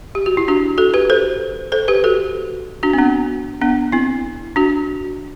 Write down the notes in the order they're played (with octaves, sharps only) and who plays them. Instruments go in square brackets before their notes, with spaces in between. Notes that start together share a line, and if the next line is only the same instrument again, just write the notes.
[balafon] G4
F#4
E4
D4 F#4
F#4 A4
G4 B4
A4 C5
A4 C5
G4 B4
F#4 A4
D4 F#4
C4
B3 D4
B3 D4
C4 E4
D4 F#4